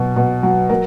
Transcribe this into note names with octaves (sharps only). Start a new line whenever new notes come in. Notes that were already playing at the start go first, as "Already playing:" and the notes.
Already playing: B2 F#3
B2
F#3
F#3 A#4